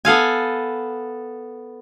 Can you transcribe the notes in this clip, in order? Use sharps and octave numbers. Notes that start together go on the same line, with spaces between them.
B3 A4 F5 G#5